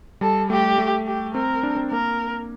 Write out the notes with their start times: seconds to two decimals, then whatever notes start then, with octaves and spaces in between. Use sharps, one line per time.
0.21 G3 A4
0.50 A3 G4
0.78 A3
1.07 G4
1.34 C4 A#4
1.63 D4
1.77 C4
1.91 A#3 A#4